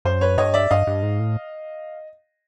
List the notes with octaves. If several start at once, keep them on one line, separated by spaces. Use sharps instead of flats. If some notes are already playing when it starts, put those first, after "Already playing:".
F#2 C5
B4 C#5
G2 C#5 D#5
D5 E5
G2 D#5 F5
G2
G#2
A2